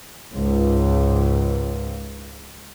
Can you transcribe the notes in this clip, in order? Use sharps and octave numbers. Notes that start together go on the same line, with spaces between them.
C#2 G#2